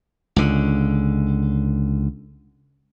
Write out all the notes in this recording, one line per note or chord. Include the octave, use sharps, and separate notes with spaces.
C#2 D3